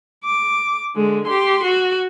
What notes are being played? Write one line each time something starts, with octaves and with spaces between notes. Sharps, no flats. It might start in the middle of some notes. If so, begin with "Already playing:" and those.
D6
D3 G#3
G4 C6
F#4